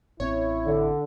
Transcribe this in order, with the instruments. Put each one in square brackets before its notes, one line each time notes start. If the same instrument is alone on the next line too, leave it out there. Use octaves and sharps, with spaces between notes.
[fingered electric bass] A1 C4 C#4 [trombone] E4 [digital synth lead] C#5
[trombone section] D3